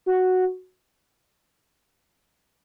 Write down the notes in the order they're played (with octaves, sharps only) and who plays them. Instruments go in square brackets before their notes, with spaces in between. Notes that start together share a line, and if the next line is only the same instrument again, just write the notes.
[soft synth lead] F#4